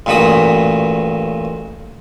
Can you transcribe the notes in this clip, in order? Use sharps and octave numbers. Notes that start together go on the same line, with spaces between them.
A1 G2 A#2 F#4 B5 D#6